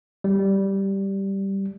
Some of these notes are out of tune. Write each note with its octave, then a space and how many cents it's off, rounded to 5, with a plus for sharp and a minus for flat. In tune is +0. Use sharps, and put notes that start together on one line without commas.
G3 -5